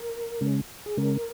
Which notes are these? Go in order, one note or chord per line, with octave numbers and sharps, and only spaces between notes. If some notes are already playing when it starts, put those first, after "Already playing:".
Already playing: A#4
C#3 G#3 C#4
G#4
C#3 G#3 C#4 A#4